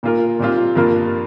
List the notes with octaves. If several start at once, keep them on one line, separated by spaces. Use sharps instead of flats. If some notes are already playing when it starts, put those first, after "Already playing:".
A#2 A#3 F4 A#4
A#2 G3 C4 F4
G2 F3 A#3 F4 A#4